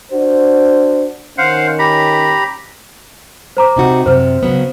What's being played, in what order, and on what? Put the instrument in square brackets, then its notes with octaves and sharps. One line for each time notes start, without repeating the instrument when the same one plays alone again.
[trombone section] D4 F#4 C5
[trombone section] D#3 C#4 [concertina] C5 F5 F#5
[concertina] G4 A#5 B5
[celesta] C5 A#5 D6
[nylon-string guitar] C3 D#4 F#4
[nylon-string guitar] F#2 C3 [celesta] C5 F6
[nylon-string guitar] C#3 F#3 B3